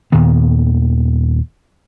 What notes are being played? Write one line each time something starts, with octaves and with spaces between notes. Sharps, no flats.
D#2 A#2 D#3 B3